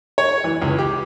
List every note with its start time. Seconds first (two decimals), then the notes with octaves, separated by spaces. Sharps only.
0.18 C#5
0.44 E3
0.62 C#2
0.79 G4